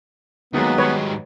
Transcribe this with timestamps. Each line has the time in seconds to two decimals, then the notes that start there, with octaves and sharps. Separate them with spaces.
0.54 D#2 D#3 F#3 G#3 B3
0.78 G#2 G3 B4 C#5